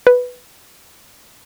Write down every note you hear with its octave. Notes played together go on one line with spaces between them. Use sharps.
B4